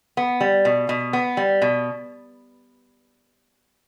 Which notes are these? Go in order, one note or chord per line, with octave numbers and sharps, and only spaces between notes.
B3
G3
B2
B2
B3
G3
B2